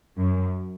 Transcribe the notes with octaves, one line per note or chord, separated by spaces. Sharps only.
F#2